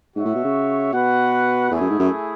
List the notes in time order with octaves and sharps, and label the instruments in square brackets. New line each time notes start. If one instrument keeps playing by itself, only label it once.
[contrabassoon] G#2 [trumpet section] F#4 C#5 E5
[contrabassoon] A2
B2
C#3
[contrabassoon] B2 [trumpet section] F#4 B4 F#5
[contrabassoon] E2 [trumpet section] A3 E4 G#4
[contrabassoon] F#2
G#2
F#2